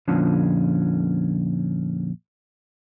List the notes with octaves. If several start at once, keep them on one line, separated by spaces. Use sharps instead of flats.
F2 A#2 D3 F3 C#4